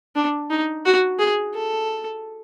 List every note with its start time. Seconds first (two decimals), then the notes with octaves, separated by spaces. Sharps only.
0.15 D4
0.50 D#4
0.85 F#4
1.19 G#4
1.54 A4